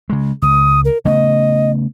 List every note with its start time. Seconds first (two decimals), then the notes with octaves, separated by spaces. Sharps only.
0.10 C#3 G#3
0.42 C#2 D#6
0.85 A#4
1.05 C#3 A3 B3 D#5